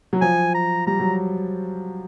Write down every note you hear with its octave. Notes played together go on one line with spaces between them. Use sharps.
F#3
F3 G#5
A#5
G3 A#5
F#3